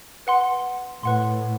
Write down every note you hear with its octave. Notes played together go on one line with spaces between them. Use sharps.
B4 F#5 C6
A2 B4 F#5 C6